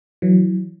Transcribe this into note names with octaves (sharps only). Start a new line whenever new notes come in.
E3 F#3